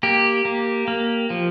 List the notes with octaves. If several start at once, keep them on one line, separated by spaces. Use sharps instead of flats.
A#3 G4
A#3
A#3
F3